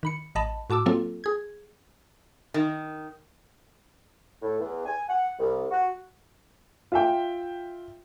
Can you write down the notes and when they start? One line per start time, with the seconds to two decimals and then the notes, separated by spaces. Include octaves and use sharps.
0.03 D#3 B5 C#7
0.35 A1 D#5 A5 B5
0.70 A2 F#4 A5 D6 E6
0.86 F#3 A#3 C4 F4 A4
1.24 G#4 G#6
2.54 D#3
4.41 A2
4.59 E2
4.85 G#5
5.08 F#5
5.39 C2
5.71 F#4
6.92 F4 E5 G5